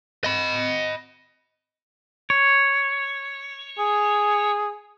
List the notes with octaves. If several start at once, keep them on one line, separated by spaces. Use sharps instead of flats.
D#5 B5
C#5
G#4